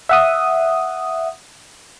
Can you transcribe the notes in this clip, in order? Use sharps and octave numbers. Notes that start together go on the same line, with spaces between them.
E5 F#5 D#6